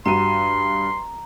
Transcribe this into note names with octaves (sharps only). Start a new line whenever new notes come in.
G2 F#4 A#5 C6 D#7